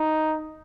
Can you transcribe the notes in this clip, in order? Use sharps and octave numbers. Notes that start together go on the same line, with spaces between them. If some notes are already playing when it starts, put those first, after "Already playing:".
Already playing: D#4